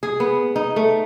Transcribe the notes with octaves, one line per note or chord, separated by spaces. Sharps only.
G#4
B3
D#4
A3